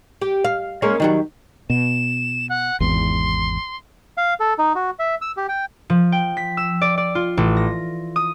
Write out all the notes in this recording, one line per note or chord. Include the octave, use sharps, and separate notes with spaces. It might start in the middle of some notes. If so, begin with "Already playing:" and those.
G4
F5
G#3 A#3 C#4
D#3 F#3 G3
B2 E7
F#5
G#1 E2 C6
F5
A4
D#4
F#4
E5
E6
G4
G5
F3
G5
B6
E6
D5
D5
F4
A1
A#6
D#6